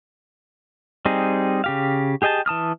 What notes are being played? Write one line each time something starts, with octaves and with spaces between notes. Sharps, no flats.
G3 C4 D#4 G#4
C#3 G4 F5
G4 G#4 D#5 G5 A5
E3 A5 D#6 F6